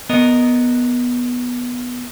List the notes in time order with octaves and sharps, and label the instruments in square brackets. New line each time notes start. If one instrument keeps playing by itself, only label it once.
[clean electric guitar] B3 A#4 D#5